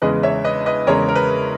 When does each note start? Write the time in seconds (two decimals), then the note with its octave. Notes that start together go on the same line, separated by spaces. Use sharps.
0.02 E2 C#3 G#3 B4 D#5
0.23 C#5 E5
0.44 B4 D#5
0.66 B4 D#5
0.87 E2 C#3 G#3 A#4 C#5
1.08 A#4
1.15 B4